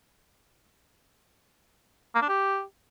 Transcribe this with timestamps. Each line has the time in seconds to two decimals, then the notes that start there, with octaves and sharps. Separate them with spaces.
2.15 A#3
2.22 D4
2.29 G4